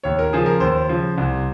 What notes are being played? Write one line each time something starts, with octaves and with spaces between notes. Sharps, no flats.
D#2 C#5
A#4
C#3 F3 G#4
A#4
D#2 C5
C#3 F3
C2